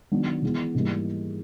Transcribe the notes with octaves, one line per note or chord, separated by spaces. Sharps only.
D#3 F#3 B3 D4
E3 G#3 B3
G#2 E3 G3 A#3